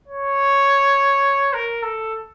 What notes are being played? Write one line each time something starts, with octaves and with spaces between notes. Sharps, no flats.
C#5
A#4
A4